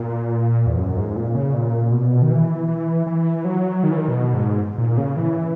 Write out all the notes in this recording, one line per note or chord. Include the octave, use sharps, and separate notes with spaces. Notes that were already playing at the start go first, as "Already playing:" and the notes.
Already playing: A#2
E2
F#2
G#2
A#2
C#3
A#2
B2
D#3
E3
E3
E3
F#3
D#3
E3
D#3
B2
G#2
A#2
C#3
E3